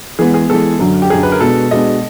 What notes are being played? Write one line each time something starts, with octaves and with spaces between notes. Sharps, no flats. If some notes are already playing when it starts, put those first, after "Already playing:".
E3 G#3 B3 G#4
G#4
E3 G#3 B3 A4
F#2 D3 F#3
G4
F#2 D3 F#3 G#4
B4
A#4
B2 G#3 B3 D4 A4
B2 G#3 B3 D4 D#5